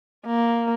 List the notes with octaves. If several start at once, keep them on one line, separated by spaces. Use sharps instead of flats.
A#3